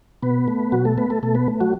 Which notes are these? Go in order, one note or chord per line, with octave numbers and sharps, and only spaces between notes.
B2 B3 B4
A3
B2 F#3 F#4
A3 A4
A3 B3 B4
A3 A4
B2 A3 A4
B3 B4
A3
F#3 F#4